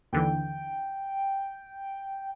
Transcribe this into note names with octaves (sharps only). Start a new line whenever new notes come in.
D#2 D3 E3 G5